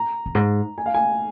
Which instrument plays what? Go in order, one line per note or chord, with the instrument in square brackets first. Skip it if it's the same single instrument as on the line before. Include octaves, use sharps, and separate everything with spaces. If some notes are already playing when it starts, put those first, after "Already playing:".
Already playing: [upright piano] A#5
[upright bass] F2
G#2
[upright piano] G#5
F5
G#5